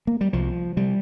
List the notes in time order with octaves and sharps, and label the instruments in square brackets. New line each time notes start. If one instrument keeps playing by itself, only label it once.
[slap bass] A#3
G3
C2 F3
C3 G3